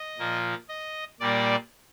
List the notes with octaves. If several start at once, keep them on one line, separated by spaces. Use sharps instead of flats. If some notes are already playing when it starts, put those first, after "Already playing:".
Already playing: D#5
A#2 F3 A#3
D#5
A#2 G3 A#3 D5